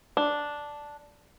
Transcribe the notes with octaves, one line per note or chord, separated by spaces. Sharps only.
D4